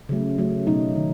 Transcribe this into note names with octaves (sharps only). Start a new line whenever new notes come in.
C#3 F#3 A3
C#3 F#3 A3
B2 F#3 A3 D#4
D#3